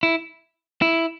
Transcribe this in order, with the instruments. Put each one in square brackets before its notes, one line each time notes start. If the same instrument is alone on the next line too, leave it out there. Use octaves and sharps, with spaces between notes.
[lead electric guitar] E4
E4